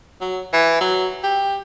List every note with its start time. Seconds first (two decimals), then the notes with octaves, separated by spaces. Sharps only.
0.21 F#3
0.53 E3
0.81 F#3
1.23 G4